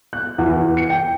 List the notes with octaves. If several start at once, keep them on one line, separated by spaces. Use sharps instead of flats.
F#6
E2
E2
C#7
G5